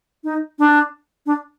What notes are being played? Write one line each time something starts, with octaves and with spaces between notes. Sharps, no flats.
D#4
D4
D4